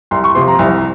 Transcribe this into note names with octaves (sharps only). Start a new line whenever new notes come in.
C2 C6
C#6
C3 F3 C6
A#5
C2